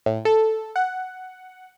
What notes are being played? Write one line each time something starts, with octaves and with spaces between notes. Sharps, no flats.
A2
A4
F#5